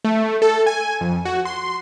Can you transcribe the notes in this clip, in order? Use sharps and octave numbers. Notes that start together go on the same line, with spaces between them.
A3
A4
G#5
F2
F#4
C6